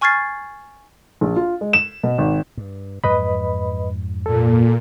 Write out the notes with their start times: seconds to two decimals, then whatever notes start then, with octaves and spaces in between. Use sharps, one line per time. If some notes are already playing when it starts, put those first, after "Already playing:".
0.01 G#5 C#6 F6 G#6 A6 C7
1.21 A#1
1.36 F4
1.61 G#3
1.73 E7
2.03 B2
2.18 G#1
2.57 G2
3.04 F2 G#2 F#3 B4 D#5 B5
4.26 A#2 A4